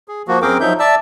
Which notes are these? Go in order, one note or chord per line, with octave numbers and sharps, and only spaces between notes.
G#4
F3 A#3 F#4
F#2 C4 G#4 A#4 G5 D6
F3 F#3 D#4 E5 G6
D5 E5 A5 E6